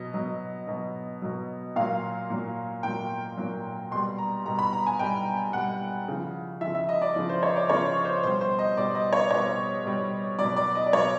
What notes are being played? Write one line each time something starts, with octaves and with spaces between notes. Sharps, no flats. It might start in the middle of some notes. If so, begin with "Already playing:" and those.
Already playing: B2 F#3 D#5
B2 F#3
B2 F#3
B2 F#3
A#2 F#3 F5
A#2 F#3
A#2 F#3 G5
A#2 F#3
B2 G3 C6
A#5
B2 G3 A#5
B5
A#5
G#5
B2 G3 G5
B2 G3 F#5
C#3 F3
F3 E5
C#3
E5
D#5
D5
C#3 F3
C5
C#5
D5
C#3 F3 C#5
C5
B2 G3 C5
C5
D#5
B2 G3 D5
D#5
C#5
B2 G3 C#5
B2 G3
B2 F#3 D5
D5
D#5
D5
B2 F#3 C#5